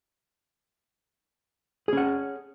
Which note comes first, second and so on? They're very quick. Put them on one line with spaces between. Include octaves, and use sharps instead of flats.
G#4 C#4 F#5